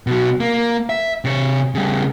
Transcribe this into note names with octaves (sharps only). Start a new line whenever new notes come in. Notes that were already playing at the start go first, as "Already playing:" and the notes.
B2 F#3
A#3
E5
C3 C#5
C#3 G3